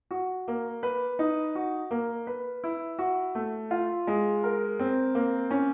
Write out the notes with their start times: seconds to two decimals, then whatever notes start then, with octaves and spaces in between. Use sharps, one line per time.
0.11 F#4
0.48 A#3
0.83 B4
1.19 D#4
1.55 F#4
1.91 A#3
2.27 B4
2.64 E4
2.99 F#4
3.35 A3
3.71 F4
4.07 G#3
4.43 A#4
4.79 C4
5.15 A#3
5.51 C#4